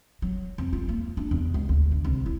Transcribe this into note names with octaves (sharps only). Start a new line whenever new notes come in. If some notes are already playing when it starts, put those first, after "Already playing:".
F#3
F2
F4
A#3
D4
E2
C#2
D2
D3
C2
E4